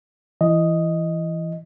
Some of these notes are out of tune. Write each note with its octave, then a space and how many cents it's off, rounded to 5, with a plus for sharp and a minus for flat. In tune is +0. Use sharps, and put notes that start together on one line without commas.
E3 +15 D#5 +0